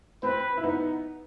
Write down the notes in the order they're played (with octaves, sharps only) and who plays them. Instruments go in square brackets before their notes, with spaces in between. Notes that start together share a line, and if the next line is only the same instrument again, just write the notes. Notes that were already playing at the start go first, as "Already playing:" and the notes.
[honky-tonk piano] C4 [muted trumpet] B4
[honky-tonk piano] E4
B3 D#4